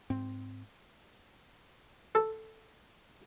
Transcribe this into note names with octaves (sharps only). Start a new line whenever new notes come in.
G#2 C4
A4